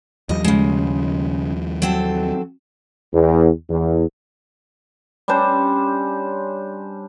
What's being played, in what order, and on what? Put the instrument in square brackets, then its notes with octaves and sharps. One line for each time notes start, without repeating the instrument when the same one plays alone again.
[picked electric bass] D#2 F3 G3 [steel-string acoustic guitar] D#5
[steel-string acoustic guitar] C#3 G#3
F#3 C4 A4
[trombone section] E2
E2
[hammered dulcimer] G3 C#4 D4 C5